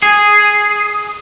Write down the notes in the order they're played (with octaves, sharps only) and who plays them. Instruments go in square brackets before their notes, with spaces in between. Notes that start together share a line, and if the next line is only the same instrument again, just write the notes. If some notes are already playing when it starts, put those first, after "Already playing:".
[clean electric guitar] G#4